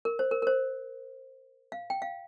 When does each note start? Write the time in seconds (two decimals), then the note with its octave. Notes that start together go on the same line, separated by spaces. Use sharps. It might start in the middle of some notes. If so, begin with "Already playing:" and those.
0.05 A#4
0.19 C5
0.31 A#4
0.42 A#4
0.47 C5
1.72 F5
1.90 G5
2.02 F5